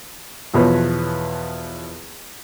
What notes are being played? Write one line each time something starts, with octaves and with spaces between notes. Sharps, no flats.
E2 B2 F3 B4 C#5